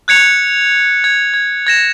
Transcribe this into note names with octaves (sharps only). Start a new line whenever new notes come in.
F#6 G#6 C#7 F7
G#6
G#6
G#6 A#6 E7